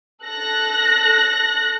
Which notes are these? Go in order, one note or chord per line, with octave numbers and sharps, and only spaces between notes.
A4 F#6 A#6